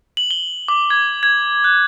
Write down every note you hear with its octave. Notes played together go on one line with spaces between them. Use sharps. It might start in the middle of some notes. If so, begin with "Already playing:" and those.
F#7
G7
D6
G#6
G#6
F#6